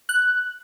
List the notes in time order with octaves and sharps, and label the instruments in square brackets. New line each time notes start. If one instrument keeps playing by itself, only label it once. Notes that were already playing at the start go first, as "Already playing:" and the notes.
[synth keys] F#6